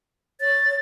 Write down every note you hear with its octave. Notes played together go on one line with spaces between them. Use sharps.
C#5 A6